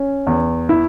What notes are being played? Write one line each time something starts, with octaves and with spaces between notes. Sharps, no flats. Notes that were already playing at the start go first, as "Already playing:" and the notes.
Already playing: C#4
E2
E4